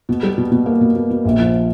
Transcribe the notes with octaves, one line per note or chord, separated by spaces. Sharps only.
B2
G3
B2
B2
A#3
B2
B2
B2
A#1
F3